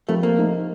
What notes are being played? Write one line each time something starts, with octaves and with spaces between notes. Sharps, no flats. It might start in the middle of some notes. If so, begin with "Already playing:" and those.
F3 A3 C4 G4 A#4
A#3
A3 D#4 A#4